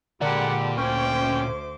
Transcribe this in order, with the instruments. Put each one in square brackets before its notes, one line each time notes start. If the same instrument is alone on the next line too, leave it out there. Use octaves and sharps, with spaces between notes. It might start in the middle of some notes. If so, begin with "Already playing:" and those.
[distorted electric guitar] A#2 A#4 [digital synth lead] D3 [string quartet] G#3 G4 B5 [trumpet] F#5
[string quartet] D2 C5 D6 [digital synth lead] C#4 [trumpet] G5